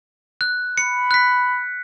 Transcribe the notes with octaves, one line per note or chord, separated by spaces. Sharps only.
F#6
B5 C#7
F#6 B6